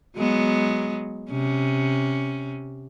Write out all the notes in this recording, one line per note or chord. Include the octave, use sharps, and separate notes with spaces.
F#3 G#3 B3
C3 C#4